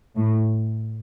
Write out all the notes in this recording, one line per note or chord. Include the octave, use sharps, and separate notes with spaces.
A2